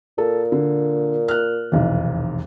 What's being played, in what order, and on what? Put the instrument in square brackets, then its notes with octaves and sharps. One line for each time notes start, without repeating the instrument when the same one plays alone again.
[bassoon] A#2 [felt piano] A4
[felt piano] D3
F6 F#6
F1 B1 E2